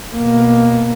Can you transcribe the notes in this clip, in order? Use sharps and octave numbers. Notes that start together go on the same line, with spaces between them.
B2 A#3